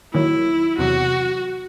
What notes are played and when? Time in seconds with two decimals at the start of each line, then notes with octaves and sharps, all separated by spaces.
0.13 D#2 D#3 F#3 E4
0.78 E2 C3 F#3 F#4